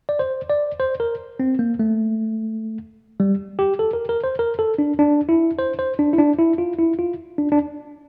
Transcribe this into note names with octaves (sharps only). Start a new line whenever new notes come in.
D5
C5
D5
C5
A#4
C4
A#3
A3
G3
G4
A4
A#4
A#4
C5
A#4
A4
D4
D4
E4
C5
C5
D4
E4
D4
E4
F4
E4
F4
D4
D4